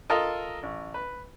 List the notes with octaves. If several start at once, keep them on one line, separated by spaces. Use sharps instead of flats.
F4 A4 A#4 D#5
A1
B4